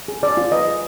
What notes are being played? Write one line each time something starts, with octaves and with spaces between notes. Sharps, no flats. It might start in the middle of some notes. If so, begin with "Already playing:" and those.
G#4
G#4 D5
F4
B4 D#5
G#4